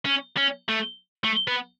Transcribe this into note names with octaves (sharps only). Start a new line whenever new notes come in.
C#4
C#4
A3
A3
B3